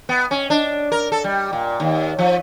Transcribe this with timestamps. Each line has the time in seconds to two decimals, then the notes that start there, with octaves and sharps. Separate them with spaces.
0.09 B3
0.31 C#4
0.50 D4
0.92 A#4
1.12 A4
1.24 G3
1.53 A#2
1.80 D#2
2.19 F3